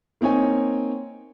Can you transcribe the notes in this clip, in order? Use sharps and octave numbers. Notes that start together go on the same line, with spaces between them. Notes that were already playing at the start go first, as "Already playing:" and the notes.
A#3 C4 D#4 C#5 G#5